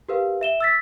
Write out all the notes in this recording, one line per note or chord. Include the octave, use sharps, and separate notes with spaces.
G4 A#4 B4 F5
E5 E7 G7
E6 A6 B6